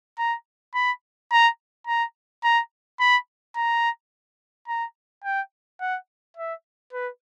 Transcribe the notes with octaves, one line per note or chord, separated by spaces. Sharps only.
A#5
B5
A#5
A#5
A#5
B5
A#5
A#5
G5
F#5
E5
B4